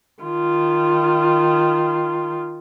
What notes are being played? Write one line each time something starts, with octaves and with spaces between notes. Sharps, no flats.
D#3 F4